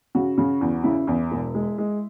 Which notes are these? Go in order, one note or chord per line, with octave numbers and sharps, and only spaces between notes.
C#3 F#4
C#3
E2
C#3 E4
E2
E1
G#3
G#3